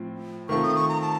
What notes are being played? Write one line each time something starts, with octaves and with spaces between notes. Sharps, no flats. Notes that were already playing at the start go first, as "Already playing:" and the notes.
Already playing: A2 F3 C4
D#3 A3 C4 F4 A4 C#6
D#6
C#6
A#5
A5